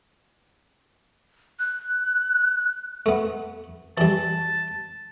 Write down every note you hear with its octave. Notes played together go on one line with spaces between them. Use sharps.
F#6
A3 B3
E3 G3 A5